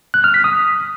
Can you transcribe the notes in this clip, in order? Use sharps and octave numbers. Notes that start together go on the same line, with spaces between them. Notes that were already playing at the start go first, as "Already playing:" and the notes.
F#6
F6
B6
D#6